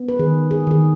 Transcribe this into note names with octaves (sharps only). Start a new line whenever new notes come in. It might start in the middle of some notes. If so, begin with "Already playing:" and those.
Already playing: B3
B4
D#3 G#4
G#4
D#3 G#4